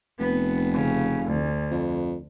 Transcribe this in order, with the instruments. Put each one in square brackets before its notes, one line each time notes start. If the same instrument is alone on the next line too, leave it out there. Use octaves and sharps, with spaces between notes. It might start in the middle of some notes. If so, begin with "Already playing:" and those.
[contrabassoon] F1 [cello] B3
[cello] C#3
D2
[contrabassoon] F2